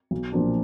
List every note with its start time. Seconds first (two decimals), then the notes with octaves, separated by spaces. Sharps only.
0.11 B1
0.32 A#2 F3 A#3 D4